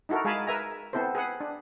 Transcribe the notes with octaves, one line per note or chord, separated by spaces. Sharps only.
D#4 E4 F#4 A4 A#4
G#3 G#4 F5 G#5 A5 B5
A#4 B4 E5 G#5 A#5
B3 C4 E4 A4 C5
G#4 B4 F#5
D4